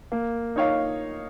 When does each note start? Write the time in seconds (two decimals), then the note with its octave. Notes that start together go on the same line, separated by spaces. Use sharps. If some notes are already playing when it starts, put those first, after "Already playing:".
0.12 A#3
0.56 D#4 C#5 F5